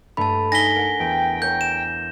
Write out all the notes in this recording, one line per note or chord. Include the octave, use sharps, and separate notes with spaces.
G2 A3 A5 B5
D#4 G#5 A#6 B6 G7
A#4 F#5 D7
E2 G5
A#4 C#5 G6
E7